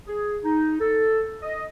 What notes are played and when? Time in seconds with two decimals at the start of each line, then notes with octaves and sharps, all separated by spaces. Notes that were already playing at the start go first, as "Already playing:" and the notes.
0.06 G#4
0.43 D#4
0.80 A4
1.41 D#5